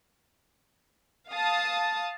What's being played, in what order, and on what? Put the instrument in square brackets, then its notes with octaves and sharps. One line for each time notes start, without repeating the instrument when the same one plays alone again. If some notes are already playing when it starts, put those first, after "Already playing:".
[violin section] F5 A5 D#6